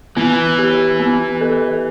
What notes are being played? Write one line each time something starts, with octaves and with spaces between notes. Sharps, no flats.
E3 B3
G4
B3
A4